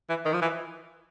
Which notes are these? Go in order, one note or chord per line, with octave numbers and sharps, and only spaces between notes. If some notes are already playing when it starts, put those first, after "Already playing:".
E3
D#3
F3
E3